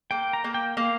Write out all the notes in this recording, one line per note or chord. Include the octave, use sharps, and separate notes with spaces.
A#3 G5
A#5
A#3
G5
A#3 F5